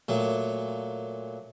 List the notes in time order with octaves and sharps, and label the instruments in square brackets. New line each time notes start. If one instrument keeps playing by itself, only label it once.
[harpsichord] A#2 F#3 A3